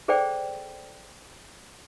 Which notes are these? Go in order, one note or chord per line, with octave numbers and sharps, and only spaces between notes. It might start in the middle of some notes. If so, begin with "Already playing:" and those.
G#4 A4 C5 D5 G5